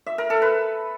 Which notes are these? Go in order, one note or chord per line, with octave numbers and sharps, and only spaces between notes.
E5
A#4
A4
B4